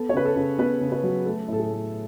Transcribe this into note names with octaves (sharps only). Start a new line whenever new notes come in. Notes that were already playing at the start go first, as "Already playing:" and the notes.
Already playing: B3 A4
C#5
C#3 B4
A4
C#3
B3 B4
C#3
B4
F#3
A3 A4
A2 A4
G#4
A3